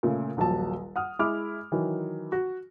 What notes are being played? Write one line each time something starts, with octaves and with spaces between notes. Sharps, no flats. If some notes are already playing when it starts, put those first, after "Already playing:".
A#2 C#3 A3
D#1 A#1 F#3 A5
F#5 D#6 F6
G#3 E4 D6 F6
D#3 E3 F#3
F#4